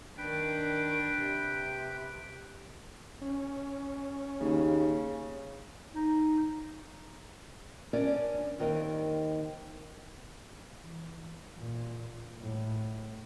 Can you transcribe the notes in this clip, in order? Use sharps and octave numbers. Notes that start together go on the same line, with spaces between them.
D#3 D4 B4 G5
C3
C#4
D#2 C#3
D#4
C#4 D4 A#4 C#5 D5
D#2 D#3 C4 A#4 D#5
E3
A#2
A2